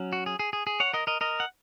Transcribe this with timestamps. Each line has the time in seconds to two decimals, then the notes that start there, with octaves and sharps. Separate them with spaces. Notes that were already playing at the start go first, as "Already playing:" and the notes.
Already playing: F#3 C#4
0.13 F#4
0.26 G#4
0.39 G#4
0.53 G#4
0.67 G#4
0.80 C#5 F#5
0.93 A#4 D#5
1.07 A#4 D#5
1.21 A#4 D#5
1.40 F#5